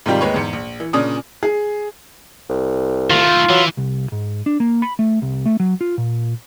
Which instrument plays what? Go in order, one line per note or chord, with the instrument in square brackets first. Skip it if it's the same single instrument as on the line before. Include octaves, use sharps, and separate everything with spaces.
[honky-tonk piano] G#2 C3 D#3 G3 F4 G4
D#2 G#3 B4 C#5 C#6
E2 G#2 C#7
A#1
E3
A#2 C#3 C#4 D4 D#6
[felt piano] G#4
[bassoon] C2
[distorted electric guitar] D#3 A3 [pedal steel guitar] F4
[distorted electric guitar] E3 [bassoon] F#3
[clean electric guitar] C2
G#2
D4
A#3
B5
A3
C2
A3
F#3
F4
A#2